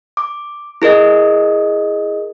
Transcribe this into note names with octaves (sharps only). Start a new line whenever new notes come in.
D6
E4 G#4 A#4 D#5